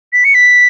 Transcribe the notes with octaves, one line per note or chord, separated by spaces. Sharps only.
B6
C#7
B6